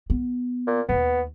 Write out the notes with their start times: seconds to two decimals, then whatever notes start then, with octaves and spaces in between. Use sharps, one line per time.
0.10 B3
0.67 A#2
0.89 D1 D#2 B3